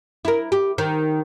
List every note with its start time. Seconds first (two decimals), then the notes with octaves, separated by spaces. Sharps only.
0.25 E4 A#4
0.52 G4
0.78 D#3